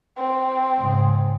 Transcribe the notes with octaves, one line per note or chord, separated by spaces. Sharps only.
C4
G#2 C#3